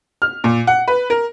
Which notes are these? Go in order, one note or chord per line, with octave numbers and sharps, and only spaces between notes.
F6
A#2
F#5
B4
A#4